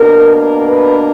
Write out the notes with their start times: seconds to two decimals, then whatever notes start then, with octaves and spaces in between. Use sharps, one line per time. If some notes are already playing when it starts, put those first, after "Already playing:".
Already playing: B2 A#3 D4 A#4
0.36 A#4
0.67 B4